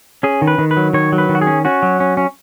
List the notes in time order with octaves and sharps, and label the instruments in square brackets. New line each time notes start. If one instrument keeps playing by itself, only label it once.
[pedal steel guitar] C#4 G#4
D#3
B4
D#3
B4
F#3
D#3 C#5
F#3
B4
D#3
F#4
G#4
C#4
C#4 F#4
F#3
C#4
C#4